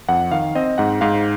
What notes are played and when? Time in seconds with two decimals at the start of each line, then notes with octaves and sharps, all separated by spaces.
0.09 F2 F#5
0.31 D#3 F5
0.55 C4 D#5
0.78 G#2 F#5
1.01 G#2 F5